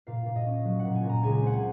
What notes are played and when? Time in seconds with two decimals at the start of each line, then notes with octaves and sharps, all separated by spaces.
0.07 A#2 F5
0.26 A#2
0.36 D#5
0.46 C#4
0.65 F#3
0.79 F#5
0.85 A#2
0.94 G#5
1.04 A#2
1.09 A#5
1.23 C#2 G#5
1.42 C4 F#5
1.52 G#5